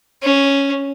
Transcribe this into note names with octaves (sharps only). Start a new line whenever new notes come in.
C#4